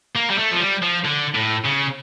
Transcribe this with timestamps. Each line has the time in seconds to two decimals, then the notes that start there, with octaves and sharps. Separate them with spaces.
0.15 A#3
0.30 G3
0.38 A3
0.51 F3
0.60 G3
0.82 F3
1.05 D3
1.35 A2
1.65 C#3